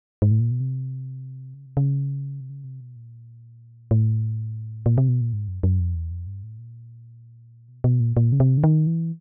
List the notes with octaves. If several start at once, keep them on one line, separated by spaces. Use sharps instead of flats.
G#2
A2
A#2
B2
C3
C#3
C3
C#3
C3
C#3
C3
B2
A#2
A2
A#2
C3
B2
A#2
G#2
F#2
F#2
F2
E2
F2
G2
A2
A#2
B2
B2
A#2
A#2
C#3
C3
D3
D#3
E3